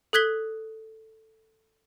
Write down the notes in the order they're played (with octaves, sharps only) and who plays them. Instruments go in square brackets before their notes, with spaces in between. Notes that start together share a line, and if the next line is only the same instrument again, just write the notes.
[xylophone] A4 D#6 F#6 G#6 B6 G7